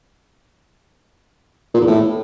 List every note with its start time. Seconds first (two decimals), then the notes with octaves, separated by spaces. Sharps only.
1.74 A#2
1.81 E2
1.87 A2